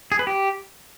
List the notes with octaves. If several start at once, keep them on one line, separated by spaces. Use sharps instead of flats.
G#4
B4
G4